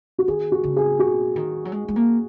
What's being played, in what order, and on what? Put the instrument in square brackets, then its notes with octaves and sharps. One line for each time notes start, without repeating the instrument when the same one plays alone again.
[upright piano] F#4
[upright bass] D#3 [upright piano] G#4
[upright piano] F#4
[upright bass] C#3
[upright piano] G#4
[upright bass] B2 [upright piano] F#4
[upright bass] D#3
F#3
G#3
G#3
A#3